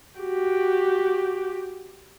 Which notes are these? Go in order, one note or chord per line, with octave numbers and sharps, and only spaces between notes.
F#4 G4